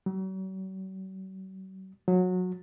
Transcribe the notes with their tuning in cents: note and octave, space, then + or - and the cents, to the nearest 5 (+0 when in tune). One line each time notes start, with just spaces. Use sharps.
F#3 +45
F#3 -20